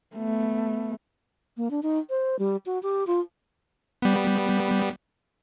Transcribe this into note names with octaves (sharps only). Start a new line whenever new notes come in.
A3 B3
A#3
D4
D#4
C5
G3
F#4
G4
F4
G3 B3